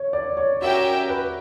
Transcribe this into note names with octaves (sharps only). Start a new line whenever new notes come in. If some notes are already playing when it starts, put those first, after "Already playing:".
Already playing: C#5
D5
C#5
C#4 F#4 G4 A#4 E5 G5
B4